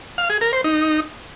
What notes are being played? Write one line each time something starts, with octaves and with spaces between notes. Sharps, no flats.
F5
G#4
A#4
C5
D#4